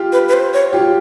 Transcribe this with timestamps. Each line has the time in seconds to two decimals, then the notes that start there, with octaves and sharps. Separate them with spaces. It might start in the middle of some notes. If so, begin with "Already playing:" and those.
Already playing: F4 G4
0.12 B4
0.28 B4
0.33 C5
0.54 C#5
0.73 F4 G4